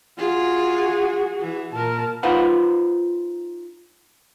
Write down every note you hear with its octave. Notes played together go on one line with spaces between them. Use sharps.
F4 F#4 G#4
E3
A#2 A#4 A5
D#4 F4 B4 C5 F#5